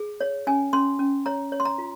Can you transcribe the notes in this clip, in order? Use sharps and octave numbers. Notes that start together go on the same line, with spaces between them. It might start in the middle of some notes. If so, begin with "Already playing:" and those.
Already playing: G#4
C#5
C#4 G#5
C#4 C6
C#4
C#5 A#5
C#5
C6
A#5
F4